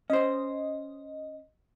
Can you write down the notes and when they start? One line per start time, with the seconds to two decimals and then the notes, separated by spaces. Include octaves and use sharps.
0.10 C#4 C5 D#5